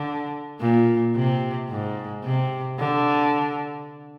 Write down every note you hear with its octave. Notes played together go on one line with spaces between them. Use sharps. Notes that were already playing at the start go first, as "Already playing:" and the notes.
Already playing: D3
A#2
C3
G#2
C3
D3